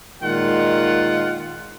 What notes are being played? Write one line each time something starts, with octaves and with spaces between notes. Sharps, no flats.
A#2 D#3 G#3 F4 F#5